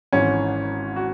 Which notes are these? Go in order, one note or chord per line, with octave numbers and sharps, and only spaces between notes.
G#1 G#2 E3 C#4
F#4